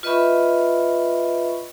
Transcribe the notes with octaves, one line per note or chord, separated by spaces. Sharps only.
F4 B4 D#5 E5 B5 C#6